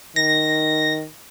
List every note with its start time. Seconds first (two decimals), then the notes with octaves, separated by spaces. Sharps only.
0.16 D#3 A#6